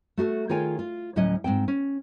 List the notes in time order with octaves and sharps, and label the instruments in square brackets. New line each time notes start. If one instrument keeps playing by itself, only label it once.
[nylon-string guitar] A3 F#4 G#4 A4
D#3 F4 G#4 C#5 G5 G#5
F4
D2 A2 F#3 C#4 C#5 D#5
G#2 E3 C4 G5
C#4